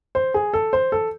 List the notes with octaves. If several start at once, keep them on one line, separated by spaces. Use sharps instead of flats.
C5
G#4
A4
C5
A4